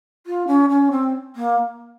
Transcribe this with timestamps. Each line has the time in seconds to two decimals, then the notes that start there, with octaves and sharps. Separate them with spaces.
0.26 F4
0.47 C#4
0.69 C#4
0.91 C4
1.36 A#3